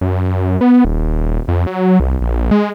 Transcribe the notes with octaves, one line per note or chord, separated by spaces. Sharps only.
F#2
B3
D#1
F2
F#3
C2
A#1
G#3